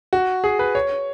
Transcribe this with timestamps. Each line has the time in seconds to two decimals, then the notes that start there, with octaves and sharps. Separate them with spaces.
0.13 F#4
0.44 G#4
0.59 B4
0.75 C#5